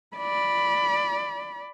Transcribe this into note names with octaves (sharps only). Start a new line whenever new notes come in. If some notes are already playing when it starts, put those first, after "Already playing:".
D5 B5